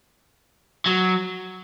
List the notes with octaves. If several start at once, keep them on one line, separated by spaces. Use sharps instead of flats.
F#3